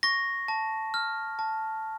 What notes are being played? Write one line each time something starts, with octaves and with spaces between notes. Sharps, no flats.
C#6 A#6
A5
F6
A5